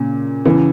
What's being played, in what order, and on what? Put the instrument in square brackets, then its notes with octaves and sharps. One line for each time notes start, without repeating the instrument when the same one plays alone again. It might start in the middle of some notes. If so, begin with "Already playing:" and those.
Already playing: [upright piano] A#2 C#3
C#3 E3